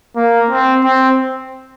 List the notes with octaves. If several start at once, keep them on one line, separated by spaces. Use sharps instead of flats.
A#3
C4
C4